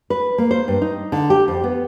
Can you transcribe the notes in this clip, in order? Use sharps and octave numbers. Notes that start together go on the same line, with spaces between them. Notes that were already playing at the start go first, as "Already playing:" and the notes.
B4
A#3
C5
G2
D#4
D3
G4
F2
B3